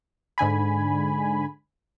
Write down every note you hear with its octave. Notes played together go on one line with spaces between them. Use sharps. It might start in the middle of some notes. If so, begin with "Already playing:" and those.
G#2 D3 G#5 B5